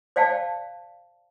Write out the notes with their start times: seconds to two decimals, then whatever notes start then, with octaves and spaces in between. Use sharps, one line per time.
0.16 C5 D5 F5 G5 A5